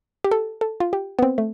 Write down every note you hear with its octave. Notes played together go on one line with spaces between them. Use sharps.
G4
A4
A4
F4
G4
B3
C4
A3